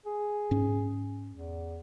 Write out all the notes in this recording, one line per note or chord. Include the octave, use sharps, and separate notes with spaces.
G#4
G#2 C#4
E2